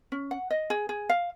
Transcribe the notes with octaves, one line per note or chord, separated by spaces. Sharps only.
C#4
F#5
D#5
G#4
G#4
F5